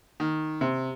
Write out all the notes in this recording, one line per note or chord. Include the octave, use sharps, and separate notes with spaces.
D#3
C3